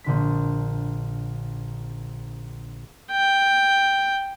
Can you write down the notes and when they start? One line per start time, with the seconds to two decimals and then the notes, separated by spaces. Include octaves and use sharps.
0.04 A#1 D3 B6
3.11 G5